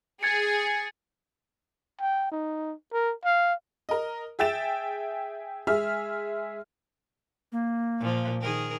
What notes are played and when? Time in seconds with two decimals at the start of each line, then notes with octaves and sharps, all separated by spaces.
0.23 G#4 G#6 A6 C#7
2.00 G5
2.31 D#4
2.93 A#4
3.25 F5
3.89 A#4 D#5
4.39 G#4 E5 G5 A6 E7
5.67 G#3 G#4 E5 F6
7.52 A#3
7.99 A#2 F3
8.41 D#3 G#4 A#4